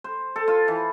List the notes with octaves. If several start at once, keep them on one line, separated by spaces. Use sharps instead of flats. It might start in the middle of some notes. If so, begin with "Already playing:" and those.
C5
A4
F4
E3